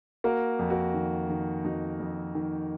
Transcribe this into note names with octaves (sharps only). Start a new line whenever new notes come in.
A#3 F#4 A#4
F2
F#4 A#4
D#3
D#3
F2 D#4 F#4
F2
D#3